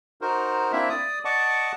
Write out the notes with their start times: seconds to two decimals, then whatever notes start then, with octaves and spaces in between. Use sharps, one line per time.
0.21 D#4 F#4 A#4 C5
0.72 A#3 C4 D4 E4 E5
0.90 D5 D#6
1.25 D5 D#5 F#5 A5 C#6 D6